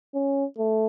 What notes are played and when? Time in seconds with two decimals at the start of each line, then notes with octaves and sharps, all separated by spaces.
0.15 C#4
0.58 A3